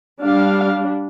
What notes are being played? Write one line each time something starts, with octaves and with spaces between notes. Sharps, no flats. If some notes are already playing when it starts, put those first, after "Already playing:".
G3 D4 F5